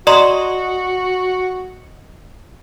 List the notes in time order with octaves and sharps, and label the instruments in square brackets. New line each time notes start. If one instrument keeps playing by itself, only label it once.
[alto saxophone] F#4 [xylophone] D5 A#5 C6 [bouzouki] D#5